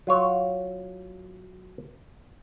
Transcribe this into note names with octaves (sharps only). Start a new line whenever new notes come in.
F#3 F4 C#5